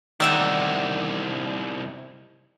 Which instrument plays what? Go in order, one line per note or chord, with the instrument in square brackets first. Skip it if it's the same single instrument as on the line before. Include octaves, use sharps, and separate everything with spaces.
[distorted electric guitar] C2 D#4 [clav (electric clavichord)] D#3 G#3 [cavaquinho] D5 E5 F#5